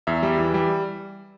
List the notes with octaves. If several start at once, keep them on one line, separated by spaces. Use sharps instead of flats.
E2 E5
G3
E3
G3